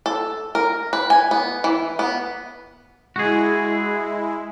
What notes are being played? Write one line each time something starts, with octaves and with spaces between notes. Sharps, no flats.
A4
A#4
B4
G#5
B3
E3
B3
G#3 E4 F#4 G#4